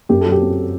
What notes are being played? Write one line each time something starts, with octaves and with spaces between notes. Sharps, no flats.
F#2 G4
F#3 A4
G4
C4